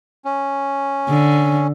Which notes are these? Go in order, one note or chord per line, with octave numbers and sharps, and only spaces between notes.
C#4
D3